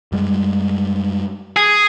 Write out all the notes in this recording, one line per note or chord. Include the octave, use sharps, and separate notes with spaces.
F#2 G3 G#3
G#4